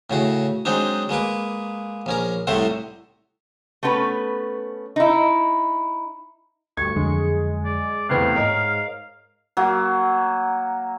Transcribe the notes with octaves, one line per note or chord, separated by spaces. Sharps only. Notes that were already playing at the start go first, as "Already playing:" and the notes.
A2 C#3 F#4
F#3 G#3 C4 D4 D#4
G#3 A#3 B4 D6
A#1 C#4 A#4
C2 A2 C3 A3 C5 F#5
A3 B3 C#4 B4
D#4 E4
D2 G2 C#6 G#6
F2 D3 F#3 G#3
D5
E2 A2 C3 B4 F5 F#6
G#2 A#4 C#5 D#5
F#3 A#3